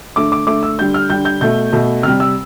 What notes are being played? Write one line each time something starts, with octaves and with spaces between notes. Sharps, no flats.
D3 A3 D6
D6
D3 A3 D6
E6
D3 G3 G6
F6
D3 G3 G6
G6
B2 A3 G6
B2 A3
C3 G3 F6
E6